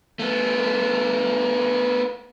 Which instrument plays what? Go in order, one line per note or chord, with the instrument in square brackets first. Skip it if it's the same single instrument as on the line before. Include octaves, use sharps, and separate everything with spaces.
[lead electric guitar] A3 B3